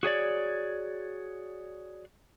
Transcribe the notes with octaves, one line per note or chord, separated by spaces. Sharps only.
F#4 G#4 C#5 D5